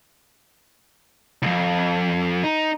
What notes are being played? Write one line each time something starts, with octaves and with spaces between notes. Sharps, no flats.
C2 F2
D#4